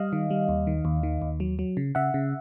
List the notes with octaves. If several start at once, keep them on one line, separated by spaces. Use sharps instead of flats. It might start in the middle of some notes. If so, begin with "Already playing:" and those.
Already playing: G3 D#5 F5
D#3
G3
D#2
D#3
D#2
D#3
D#2
F#3
F#3
C#3
C#3 E5 F#5
C#3